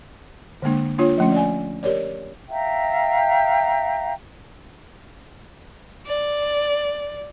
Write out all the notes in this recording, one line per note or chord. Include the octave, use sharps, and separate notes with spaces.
D3 G#3 A#3 D4
A#3 D4 F4 C#5
F3 A3 C#4
D5 G#5
G4 A#4 C#5 D5
E5 F5 G5 A#5
D5